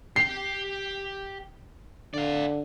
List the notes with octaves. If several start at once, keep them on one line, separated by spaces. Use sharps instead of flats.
G4 G5 C7
D3 D5 F5